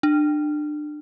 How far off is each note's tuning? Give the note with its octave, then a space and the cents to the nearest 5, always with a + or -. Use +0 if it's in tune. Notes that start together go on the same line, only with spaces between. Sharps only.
D4 +30